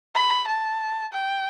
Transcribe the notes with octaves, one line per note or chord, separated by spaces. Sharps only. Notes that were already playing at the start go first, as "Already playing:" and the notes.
B5
A5
G5